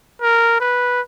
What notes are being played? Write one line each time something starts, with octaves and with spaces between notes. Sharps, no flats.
A#4
B4